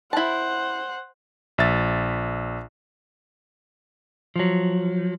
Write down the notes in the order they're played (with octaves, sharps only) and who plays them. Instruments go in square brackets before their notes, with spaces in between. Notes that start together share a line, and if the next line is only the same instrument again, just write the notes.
[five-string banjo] E4 A5 [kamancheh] C5 F#5
[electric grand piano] A#1 E5 A6
[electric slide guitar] F3 F#3